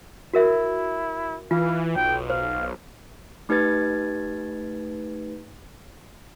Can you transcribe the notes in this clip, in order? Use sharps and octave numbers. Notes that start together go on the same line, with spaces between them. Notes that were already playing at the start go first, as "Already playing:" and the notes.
E4 F#4 A#4 E5
E3 F4 F5
B1 G5
C5 F5
A3 D#4 G4 B4 G#6 A6